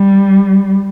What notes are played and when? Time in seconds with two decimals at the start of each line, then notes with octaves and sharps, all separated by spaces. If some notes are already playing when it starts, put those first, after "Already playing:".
Already playing: G3